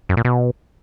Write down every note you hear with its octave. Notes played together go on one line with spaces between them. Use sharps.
F#2
A#2
B2